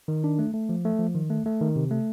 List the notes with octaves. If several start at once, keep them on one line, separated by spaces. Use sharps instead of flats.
D#3
D4
A3
A3
F3
A3
F3
D#3
A3
A3
D#3
C3
A3